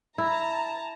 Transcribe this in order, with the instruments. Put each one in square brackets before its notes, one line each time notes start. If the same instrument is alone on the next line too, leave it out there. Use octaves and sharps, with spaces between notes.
[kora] E4 [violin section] A5 A#5